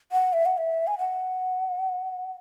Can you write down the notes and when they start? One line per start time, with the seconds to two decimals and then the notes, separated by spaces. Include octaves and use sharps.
0.12 F#5
0.33 E5
0.46 F#5
0.57 E5
0.87 G#5
0.99 F#5